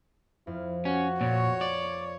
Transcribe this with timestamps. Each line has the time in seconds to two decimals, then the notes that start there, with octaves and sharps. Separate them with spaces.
0.47 F2 E4
0.85 C#4 F#4
1.21 A#2 C#5
1.61 D5